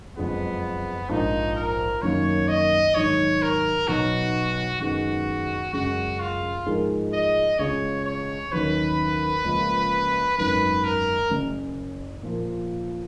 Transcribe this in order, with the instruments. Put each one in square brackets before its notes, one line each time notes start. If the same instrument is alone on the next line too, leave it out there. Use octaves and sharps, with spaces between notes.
[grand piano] F#1 F2 F3 G#3 [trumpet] B3
[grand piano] A#1 G#2 F3 [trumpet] D#4
[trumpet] A#4
[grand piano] F#2 D#3 F#3 A#3 [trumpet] C#5
[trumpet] D#5
[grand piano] G#2 D#3 F#3 [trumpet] C#5
[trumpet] A#4
[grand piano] B1 B2 F#3 B3 D#4 [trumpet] F#4
[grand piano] F#2 D#3 G#3 B3 D#4 [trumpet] F#4
[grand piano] F#2 C#3 G#3 [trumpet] F#4
[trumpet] F4
[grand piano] G#2 F3 G#3 D#4 A#4
[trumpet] D#5
[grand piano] C#2 C#3 G#3 [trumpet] C#5
[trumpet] C#5
[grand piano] D#2 D#3 F#3 C#4 [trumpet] B4
[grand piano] C#2 C#3 F3 A#3 F4
[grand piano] G#1 F#2 D#3 F#3 [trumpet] B4
[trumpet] A#4
[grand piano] F#1 F#2 C#3 F#3 C#4
A#2 F3 A#3 F4